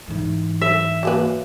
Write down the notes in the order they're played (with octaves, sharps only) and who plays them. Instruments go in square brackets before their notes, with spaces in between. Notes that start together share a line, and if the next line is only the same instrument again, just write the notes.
[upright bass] G#2 E3
[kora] E5
[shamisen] F#3 A#3 B4